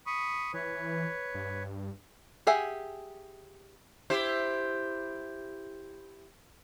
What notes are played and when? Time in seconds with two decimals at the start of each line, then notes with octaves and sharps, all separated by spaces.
0.06 B5 C#6 D#6
0.54 E3 B4 C#5
1.35 G2
2.47 G4 G#4 E5 F#5 G#5
4.10 E4 G4 C5